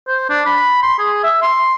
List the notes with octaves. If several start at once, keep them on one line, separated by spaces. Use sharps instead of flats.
C5
D4
B5
C6
G#4
E5
C6